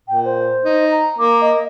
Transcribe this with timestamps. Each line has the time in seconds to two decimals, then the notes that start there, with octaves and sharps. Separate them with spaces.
0.08 A#2 G5
0.25 C5
0.65 D#4
0.91 A#5
1.19 A#3 D6
1.41 D#5